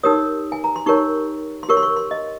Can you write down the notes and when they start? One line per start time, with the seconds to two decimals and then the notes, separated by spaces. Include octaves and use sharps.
0.03 D#4 G4 A#4 C#5 D#6
0.52 G#5
0.64 A#5
0.76 C6
0.86 D#4 G4 A#4 C#5 C#6
1.63 C6
1.69 G4 A#4 C#5 C#6
1.77 C6
1.83 C#6
1.96 C6
2.11 D#5